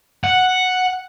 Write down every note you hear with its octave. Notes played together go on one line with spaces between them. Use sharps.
F#5